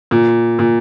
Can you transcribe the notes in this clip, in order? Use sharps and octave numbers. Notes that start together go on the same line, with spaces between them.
A#2
A#2